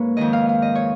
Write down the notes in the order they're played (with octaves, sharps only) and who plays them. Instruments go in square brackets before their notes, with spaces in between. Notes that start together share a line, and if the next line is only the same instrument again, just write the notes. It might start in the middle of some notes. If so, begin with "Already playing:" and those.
Already playing: [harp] G#2 A#3 B4 C#5
F2 D#3 G#3 D#5
F5
F5
D#5
C#5